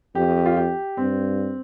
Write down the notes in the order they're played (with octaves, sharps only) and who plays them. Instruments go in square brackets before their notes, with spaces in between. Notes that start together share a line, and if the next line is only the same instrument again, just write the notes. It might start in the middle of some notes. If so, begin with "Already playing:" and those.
[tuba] F2 [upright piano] G4
[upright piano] F4
G4
[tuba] G2 [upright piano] C4